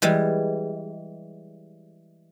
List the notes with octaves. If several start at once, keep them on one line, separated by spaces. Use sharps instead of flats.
E3 G3 G#3